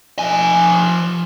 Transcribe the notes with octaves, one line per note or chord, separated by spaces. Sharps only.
F3 G#5